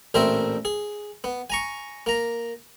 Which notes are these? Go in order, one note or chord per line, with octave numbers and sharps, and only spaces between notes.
A1 A#2 C4 A#4 E5
G#4
B3
G#5 A#5 C#6
A#3 A#5